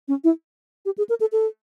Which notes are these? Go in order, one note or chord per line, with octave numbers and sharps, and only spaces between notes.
C#4
E4
G4
G#4
A#4
A4
A4